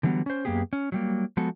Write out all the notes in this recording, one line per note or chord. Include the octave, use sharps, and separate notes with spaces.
D3 E3 F#3 G3 B3
C#4 C5
F#2 A#3 B3 G4 G#4
C#4
F#3 G3 A#3
F3 G#3 B3 F#4 A4